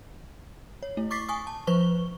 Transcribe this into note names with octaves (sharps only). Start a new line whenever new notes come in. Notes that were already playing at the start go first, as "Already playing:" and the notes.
C#5
A3 E4
C#6 D6 A6 B6 C7
G#5 C#6 D#6
A5
F3 B4 C5 C#6 G7